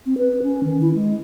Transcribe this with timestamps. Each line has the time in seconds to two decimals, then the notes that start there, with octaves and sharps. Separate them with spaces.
0.06 C4
0.18 B4
0.43 C#4
0.64 D#3
0.81 E4
0.95 G#3